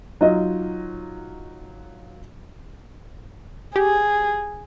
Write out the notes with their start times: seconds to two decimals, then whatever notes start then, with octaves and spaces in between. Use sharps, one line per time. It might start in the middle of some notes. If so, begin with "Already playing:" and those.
0.21 F#3 D#4 F4 D#5
3.76 G4 G#4